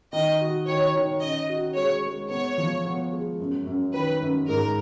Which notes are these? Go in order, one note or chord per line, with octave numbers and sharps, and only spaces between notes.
D#3 D#5
F#4
D#3 C#5
D#3
C#4 D#5
F#4
G#3 C#5
G#3
B3 C#5
F3
B3
G#3
F#2
F#2
D#3 B4
F#2
G#2 A#4